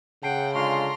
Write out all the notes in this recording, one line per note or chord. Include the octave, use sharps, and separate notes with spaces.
C#3 F#5 G5 A5 C7 D7
D3 G#3 F4 A5 A#5 C6 C#6 C7